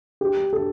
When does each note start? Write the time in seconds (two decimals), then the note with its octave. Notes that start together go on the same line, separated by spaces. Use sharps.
0.21 G4
0.53 A4